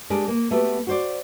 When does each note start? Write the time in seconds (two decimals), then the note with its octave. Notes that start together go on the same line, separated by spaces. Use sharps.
0.10 G#3 D4 G4 A#4 D5
0.28 A#3
0.51 A3 B3 F#4 G4
0.87 F#4 C5 D5